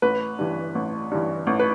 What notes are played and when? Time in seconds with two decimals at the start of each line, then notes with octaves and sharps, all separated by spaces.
0.02 A1 B4
0.39 G2 E3
0.75 A1
1.11 G2 E3
1.47 A1
1.59 B4